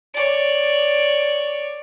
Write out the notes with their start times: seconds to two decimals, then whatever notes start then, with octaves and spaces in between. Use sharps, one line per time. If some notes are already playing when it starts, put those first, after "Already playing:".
0.14 C#5 D5